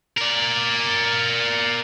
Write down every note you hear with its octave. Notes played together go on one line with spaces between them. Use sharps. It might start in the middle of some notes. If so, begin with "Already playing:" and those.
A#4 D5